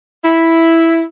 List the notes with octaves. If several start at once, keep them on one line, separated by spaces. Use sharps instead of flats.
E4